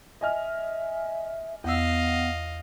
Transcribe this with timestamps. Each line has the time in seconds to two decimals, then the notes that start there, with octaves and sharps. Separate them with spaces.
0.21 D#5 E5 G#5 F6
1.64 E2 B3 D#5 F5 F#5 E6